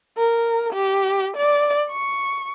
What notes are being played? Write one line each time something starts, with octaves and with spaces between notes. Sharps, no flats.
A#4
G4
D5
C#6